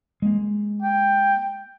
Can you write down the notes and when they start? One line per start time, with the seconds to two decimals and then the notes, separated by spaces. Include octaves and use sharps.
0.22 G#3 A#3
0.82 G5